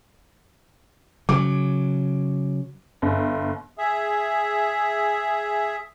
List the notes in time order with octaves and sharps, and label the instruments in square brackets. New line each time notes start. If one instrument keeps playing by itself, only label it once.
[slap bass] C#3 F#3 [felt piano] D6
[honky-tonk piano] G1
[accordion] G#4 E5